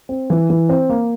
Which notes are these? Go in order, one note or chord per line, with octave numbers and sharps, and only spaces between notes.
C4
E3
E3
C4
A#3